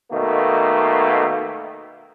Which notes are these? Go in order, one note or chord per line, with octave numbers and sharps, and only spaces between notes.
B2 D#3 A3 A#3